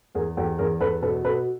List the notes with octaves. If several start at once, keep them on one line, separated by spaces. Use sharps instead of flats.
E2 G#4 A#4
E2 G4 A4
E2 G#4 A#4
E2 A4 B4
B2 A4 B4
B2 A4 B4